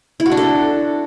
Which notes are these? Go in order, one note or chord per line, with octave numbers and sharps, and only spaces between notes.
E4
F#4
D4
A4